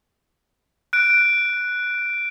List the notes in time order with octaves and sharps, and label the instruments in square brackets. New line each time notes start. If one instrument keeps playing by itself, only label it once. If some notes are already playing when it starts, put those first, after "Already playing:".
[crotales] F#6 D7